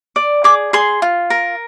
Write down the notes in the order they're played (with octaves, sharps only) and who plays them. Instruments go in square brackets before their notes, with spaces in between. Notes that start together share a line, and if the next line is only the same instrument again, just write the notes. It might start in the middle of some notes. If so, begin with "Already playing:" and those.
[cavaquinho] D5
G#4 D6
G#4 C6
F4
A#4